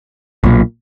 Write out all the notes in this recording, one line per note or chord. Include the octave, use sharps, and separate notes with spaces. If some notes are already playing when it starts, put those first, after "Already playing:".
B1 A#2